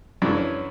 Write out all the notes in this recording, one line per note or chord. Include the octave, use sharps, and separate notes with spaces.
F#2 C#3 E3 D4
C#4